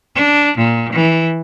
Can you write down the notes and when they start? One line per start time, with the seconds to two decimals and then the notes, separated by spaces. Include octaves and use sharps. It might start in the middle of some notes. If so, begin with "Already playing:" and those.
0.16 D4
0.58 A#2
0.93 E3